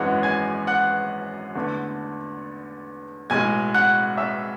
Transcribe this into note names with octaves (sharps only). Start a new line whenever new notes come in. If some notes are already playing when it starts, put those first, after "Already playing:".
Already playing: G#1 F#2 E3 G#3 F#5
G#5 G#6
F#5 F#6
E2 D3 A3
B1 A2 G#3 G#5 G#6
F#5 F#6
E5 E6